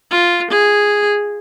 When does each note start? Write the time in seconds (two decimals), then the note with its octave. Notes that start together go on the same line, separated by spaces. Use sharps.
0.10 F4
0.50 G#4